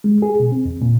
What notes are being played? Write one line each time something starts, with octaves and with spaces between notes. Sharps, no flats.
G#3
G#4
B2
C4
E2
A#2